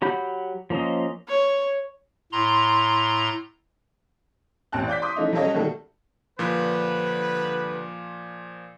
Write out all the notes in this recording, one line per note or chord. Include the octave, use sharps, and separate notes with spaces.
F#3 G4 F#5 B5 G6
F3 A#3 C#4 C5 D#5
C#5
A2 A#5 C6
A1 C4 A5 F#6
D5 D6 G6 B6
C6 D6 D#6
F3 A3 C#4 D#4 E4
F#3 G3 C#4 A4 C#5 D#5
A#2 D#3 G3 A3 F#4 A4
G2 A#2 D3 F3 B4